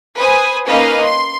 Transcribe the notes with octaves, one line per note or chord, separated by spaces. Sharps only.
B4 C5 G#5 D#6
A#3 C#4 D#4 B4 D#5 F5
C6